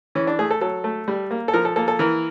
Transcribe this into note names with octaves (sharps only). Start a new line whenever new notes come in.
E3 C#4
D4
A3 G#4
A4
F#3 A4
A3
G3
A#3
A4
F3 A#4
A4
A#3 A4
A4
E3 A#4